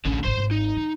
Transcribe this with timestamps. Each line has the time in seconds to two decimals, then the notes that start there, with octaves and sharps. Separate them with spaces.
0.05 A1 D2 D3 C#4
0.24 G#1 D3 C5 C6
0.37 G#1
0.51 D#4
0.76 D#3